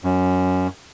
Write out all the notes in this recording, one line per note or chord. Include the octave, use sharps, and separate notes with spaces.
F#2